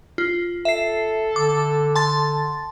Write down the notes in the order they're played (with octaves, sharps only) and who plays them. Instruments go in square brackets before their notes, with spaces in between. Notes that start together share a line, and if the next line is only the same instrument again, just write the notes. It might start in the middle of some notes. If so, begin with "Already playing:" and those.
[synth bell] F4
[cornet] A4 [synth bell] E5 C7
[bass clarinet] D3 [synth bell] D6
[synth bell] A5 C6 A6